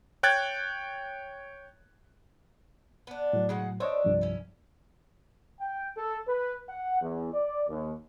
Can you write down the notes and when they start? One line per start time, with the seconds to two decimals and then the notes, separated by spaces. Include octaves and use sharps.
0.23 C#5 G5 F#6 G#6 A6
3.07 B3 D4
3.33 A2 F#3
3.49 C#3 G#3 F#5
3.80 D4 C5 C#5 D#5 E5
4.04 C2 G2 F3
4.21 C#4 E4
5.61 G5
5.97 A4
6.28 B4
6.70 F#5
7.02 E2
7.33 D5
7.68 D#2